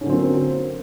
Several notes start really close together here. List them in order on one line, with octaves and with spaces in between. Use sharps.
C#4 D3 F#3 C4 A#3